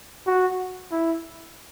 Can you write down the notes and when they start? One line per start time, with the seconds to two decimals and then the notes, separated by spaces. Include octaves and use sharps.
0.27 F#4
0.92 E4